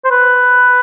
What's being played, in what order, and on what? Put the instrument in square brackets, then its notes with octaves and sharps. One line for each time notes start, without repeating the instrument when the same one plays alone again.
[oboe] C5
B4